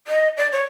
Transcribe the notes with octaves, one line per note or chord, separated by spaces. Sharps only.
D#5
D5
C#5